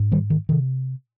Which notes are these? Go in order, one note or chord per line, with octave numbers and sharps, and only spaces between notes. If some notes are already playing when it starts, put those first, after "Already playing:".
Already playing: G#2
D#3 G3
D#3
C3 D#3